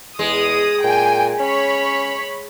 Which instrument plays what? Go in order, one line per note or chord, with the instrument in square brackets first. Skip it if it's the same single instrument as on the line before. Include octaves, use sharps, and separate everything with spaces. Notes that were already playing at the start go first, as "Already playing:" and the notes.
[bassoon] E2 [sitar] G#3 [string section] D#6
[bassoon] A#2 [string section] G5 G#5
[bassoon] C#4 [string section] C#5 B5